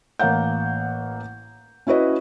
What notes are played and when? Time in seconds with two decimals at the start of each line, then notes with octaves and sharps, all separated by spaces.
0.19 A1 A#3 F5 F#5 G6
1.87 C#4 E4 F#4 B4 D#5